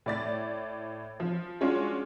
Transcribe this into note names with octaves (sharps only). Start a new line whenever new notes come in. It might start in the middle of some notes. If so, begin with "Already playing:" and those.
A2 D5 A6
F3
G#3 C#4 D4 F4 F#4